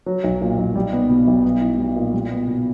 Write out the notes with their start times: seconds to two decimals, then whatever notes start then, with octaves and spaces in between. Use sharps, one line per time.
0.06 F#3
0.24 B1
0.41 A#2
0.58 B1
0.76 G3
0.93 B3
1.10 B2
1.27 B1
1.44 B3
1.61 E4
1.79 G3
1.96 A#2
2.14 G3
2.31 B3
2.47 B2